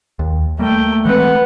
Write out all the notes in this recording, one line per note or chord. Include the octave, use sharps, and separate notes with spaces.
D#2
G3 A3 A#3 G5
E3 G#3 C4 B4 F#5